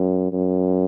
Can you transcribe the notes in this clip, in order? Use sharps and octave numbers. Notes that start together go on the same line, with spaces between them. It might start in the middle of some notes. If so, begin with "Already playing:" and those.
Already playing: F#2
F#2